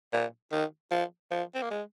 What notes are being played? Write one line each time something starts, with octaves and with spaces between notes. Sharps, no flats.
A#2
D#3
F3
F3
C4
A#3
G#3